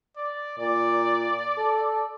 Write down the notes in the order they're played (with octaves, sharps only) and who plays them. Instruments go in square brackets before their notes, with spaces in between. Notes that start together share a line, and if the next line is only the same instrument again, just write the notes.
[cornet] D5
[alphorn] A#2 [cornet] D5
[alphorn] A4